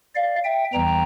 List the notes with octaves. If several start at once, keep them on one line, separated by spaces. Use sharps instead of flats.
D5 F5
E5 G5
E2 E3 G3 G5 A#5